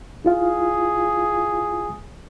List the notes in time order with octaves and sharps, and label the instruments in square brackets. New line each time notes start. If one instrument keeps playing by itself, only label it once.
[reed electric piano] E4 F4 F5 [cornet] G#4